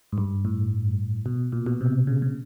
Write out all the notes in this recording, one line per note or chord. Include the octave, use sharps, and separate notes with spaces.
G#2
G2
A2
B2
A#2
B2
C3
C#3
C#3